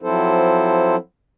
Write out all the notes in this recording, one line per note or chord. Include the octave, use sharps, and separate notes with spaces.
F3 F#3 C4 E4 A4 C5